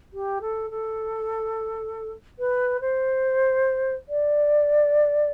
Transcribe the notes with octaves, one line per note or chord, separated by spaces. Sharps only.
G4
A4
A4
B4
C5
D5